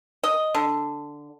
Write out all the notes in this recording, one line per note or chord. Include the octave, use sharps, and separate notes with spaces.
D#5
D3